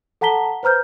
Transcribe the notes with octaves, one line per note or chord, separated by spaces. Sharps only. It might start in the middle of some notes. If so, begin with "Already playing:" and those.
A4 F#5 A5 A#5 B6 G7
B4 C5 A#5 F6 G6